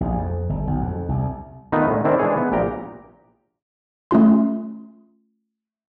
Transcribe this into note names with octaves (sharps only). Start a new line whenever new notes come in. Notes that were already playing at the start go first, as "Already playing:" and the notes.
A#1
F2
G1
B1
F2
C2
D#3 A3 B3 D#4 F4 B4
A2 D3 G#3
D#3 C4 D4 E4
E3 G#3 D4 E4 G#4 C#5
B3
A#1 A#2 G4 G5 A#5
A3 C#4 F4 C6